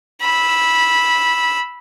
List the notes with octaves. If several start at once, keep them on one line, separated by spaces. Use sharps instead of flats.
B5 E6